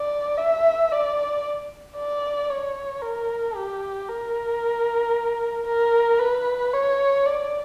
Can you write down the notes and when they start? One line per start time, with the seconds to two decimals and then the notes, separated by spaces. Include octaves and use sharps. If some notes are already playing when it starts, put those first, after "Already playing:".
Already playing: D5
0.38 E5
0.92 D5
1.96 D5
2.50 C#5
3.02 A#4
3.56 G4
4.09 A#4
5.66 A#4
6.19 B4
6.73 C#5
7.26 D5